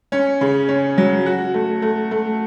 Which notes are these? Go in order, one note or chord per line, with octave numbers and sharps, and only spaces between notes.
C#4
C#3
C#4
F#3
F#4
A3
A3
A3